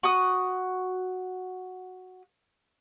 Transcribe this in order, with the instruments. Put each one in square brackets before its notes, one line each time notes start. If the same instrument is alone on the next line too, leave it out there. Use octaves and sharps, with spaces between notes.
[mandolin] F#4 D#6